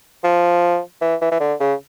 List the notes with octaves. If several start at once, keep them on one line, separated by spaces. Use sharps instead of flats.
F3
E3
E3
E3
D3
C#3